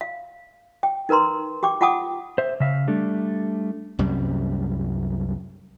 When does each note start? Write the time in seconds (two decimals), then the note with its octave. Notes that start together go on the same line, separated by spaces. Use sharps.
0.01 F5
0.83 G5
1.09 D#4 A#4 B4 A#5 C6
1.63 G4 G5 D6
1.81 F4 F#5 G5 A5 D6 D#6
2.38 C5 E5
2.60 C#3 E5 F5
2.87 G3 A3 D4
3.99 C2 F#2 G3